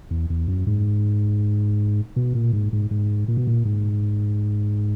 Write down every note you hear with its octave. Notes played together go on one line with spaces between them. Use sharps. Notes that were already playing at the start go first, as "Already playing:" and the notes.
E2
E2
F#2
G#2
B2
A#2
G#2
G#2
G#2
A#2
B2
A#2
G#2